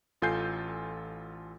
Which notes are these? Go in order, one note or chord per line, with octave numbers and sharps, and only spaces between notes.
A1 F4 A4 G#5 G6 C7